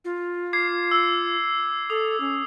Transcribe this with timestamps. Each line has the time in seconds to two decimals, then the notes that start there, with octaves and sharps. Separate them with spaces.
0.05 F4
0.53 D6 G#6 C7
0.91 E6
1.90 A4 D#6
2.20 C#4